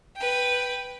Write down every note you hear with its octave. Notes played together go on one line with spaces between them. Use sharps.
B4 G5